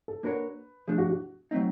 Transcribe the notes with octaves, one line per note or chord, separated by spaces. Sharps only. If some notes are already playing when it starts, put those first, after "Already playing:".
A4
A#3 D4 F#4 A#4 B4 C#5
F3 A3 D4 G#4
F#4
F#4
F#3 A3 C4 D#4